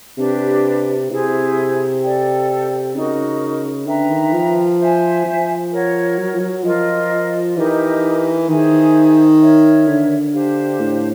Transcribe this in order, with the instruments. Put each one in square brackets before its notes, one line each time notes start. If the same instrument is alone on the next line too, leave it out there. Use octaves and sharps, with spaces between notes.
[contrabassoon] C3 [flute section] D4 G4 B4
[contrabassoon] C3 [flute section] E4 G#4 C5
[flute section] A4 D5 G5
[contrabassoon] C#3 [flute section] D#4 F#4 A#4
[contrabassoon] D3 [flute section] B4 E5 G5 A#5
[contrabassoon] D#3
F3
[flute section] C5 E5 G#5
[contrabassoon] F3
[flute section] A#4 C#5 F#5
[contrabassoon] F#3
F3
F#3
[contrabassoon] F3 [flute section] F4 A#4 D#5
[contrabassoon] E3 [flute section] D#4 G4 A#4 D#5
[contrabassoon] D#3 [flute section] G#4 C5 E5 G#5
[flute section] A#4 C#5 E5
[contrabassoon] D3
[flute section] D4 G4 C5 F5
[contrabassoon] A2